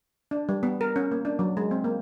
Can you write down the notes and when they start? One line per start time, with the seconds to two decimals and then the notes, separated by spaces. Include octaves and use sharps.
0.31 D4
0.49 G3
0.63 B3
0.81 A#4
0.96 C#4
1.12 A#3
1.25 D4
1.39 F#3
1.57 G#3
1.71 C4
1.84 A#3